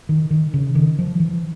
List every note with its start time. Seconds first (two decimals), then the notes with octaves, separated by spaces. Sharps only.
0.09 D#3
0.31 D#3
0.54 C#3
0.75 D#3
0.99 F3
1.20 E3